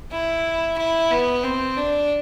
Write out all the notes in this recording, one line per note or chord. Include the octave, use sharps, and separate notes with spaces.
E4
E4
B3
C4
D4